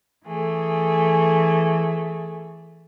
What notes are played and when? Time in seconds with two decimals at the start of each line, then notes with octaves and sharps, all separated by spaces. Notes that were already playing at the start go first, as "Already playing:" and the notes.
0.24 E3 A3 G#4